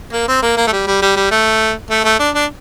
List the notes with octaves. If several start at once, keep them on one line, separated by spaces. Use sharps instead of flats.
A#3
C4
A#3
A#3
A3
G3
G3
G3
G3
A3
A3
A3
D4
D4